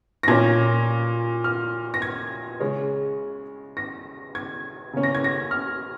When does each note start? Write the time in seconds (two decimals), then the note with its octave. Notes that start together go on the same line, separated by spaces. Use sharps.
0.23 A#6
0.28 A#2 A#3 C#4 G#6
1.44 F6
1.94 A#6
2.02 G#6
2.60 C#3 G#3 C#4
3.77 A#6
4.35 G#6
4.94 C#3 A#3 C#4
5.03 A#6
5.15 G#6
5.24 A#6
5.51 F6